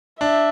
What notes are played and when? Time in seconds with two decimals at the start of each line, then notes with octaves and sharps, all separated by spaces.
0.20 D4 E5